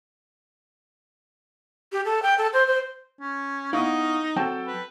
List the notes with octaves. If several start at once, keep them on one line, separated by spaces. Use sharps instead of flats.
G4
A4
G5
A4
C5
C5
C#4
B3 D#4 E4 F5 C#6 D#6
F#3 C4 A4 G5 A5
B4